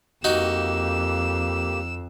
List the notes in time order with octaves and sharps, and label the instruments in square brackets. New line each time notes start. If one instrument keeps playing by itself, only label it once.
[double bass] F2 [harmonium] A#3 G4 [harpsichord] D#4 F#4 [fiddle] E6